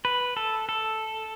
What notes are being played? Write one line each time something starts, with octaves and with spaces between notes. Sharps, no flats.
B4
A4
A4